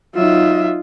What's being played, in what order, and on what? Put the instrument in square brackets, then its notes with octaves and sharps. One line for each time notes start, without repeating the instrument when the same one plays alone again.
[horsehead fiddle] F#3 E5 [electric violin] D#4 F4